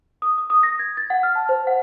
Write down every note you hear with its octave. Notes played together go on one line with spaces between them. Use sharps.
D#6
D#6
D#6
A#6
G#6
A6
F#5
F6
A5
C5
F#5